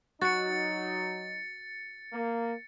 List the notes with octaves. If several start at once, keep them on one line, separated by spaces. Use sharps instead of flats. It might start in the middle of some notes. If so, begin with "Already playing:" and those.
F#3 D#4 F#4 A6 C#7
A#3